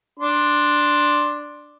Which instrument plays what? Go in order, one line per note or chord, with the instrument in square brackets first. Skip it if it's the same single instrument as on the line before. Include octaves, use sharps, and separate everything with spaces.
[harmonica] D4 C6